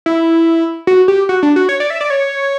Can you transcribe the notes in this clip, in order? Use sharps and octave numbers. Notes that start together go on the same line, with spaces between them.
E4
F#4
G4
F#4
D4
F#4
C#5
D5
E5
D5
C#5